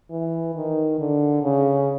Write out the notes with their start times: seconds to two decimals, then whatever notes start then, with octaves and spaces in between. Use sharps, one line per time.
0.10 E3
0.55 D#3
0.99 D3
1.43 C#3